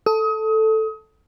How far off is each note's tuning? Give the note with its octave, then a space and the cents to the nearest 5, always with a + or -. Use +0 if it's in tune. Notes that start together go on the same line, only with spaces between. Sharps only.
A4 +0 D#6 +30